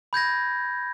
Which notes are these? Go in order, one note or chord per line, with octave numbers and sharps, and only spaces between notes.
B5 G6 G#6 A#6